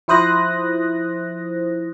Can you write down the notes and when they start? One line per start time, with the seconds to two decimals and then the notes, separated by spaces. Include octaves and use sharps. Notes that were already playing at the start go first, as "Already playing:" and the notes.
0.08 F3 E4 C5 D#6 F#6 A#6